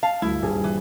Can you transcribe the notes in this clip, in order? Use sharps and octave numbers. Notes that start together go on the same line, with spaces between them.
F5 A5
D2 G2 E4
D#1 G2 G#4
E3